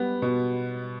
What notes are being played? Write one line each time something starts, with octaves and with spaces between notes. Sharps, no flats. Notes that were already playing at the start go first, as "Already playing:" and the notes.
Already playing: G3 B3
B2